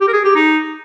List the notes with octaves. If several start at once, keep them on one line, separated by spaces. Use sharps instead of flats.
G4
A#4
G#4
G4
D#4